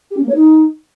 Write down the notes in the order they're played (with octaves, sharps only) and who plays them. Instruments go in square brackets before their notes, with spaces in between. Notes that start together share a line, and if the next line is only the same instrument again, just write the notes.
[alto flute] G4
C#4
A#3
C#5
D#4